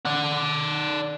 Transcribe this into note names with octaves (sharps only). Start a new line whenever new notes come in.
D5 F#5